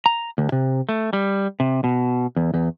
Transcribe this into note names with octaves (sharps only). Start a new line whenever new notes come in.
A#5
D2
C3
A3
G3
C3
B2
E2
E2